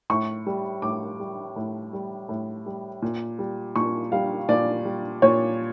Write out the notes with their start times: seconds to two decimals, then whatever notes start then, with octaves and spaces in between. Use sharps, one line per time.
0.10 A2 C#6
0.46 G3
0.82 A2 D6
1.20 G3
1.56 A2
1.93 G3
2.29 A2
2.66 G3
3.02 A#2
3.39 G3
3.76 A#2 C#6
4.12 G3 F5
4.49 A#2 D5
4.85 G3
5.22 A#2 C#5